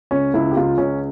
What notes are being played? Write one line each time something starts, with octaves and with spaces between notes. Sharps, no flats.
C#2 C#4
C#2 E4
G4
C#2 F4
C#2 C#4